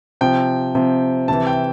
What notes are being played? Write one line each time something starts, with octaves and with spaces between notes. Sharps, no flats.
C3 F3 G5
C3 F3
C3 E3 A5
G5